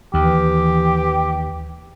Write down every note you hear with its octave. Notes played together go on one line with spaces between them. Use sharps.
D#2 E3 G4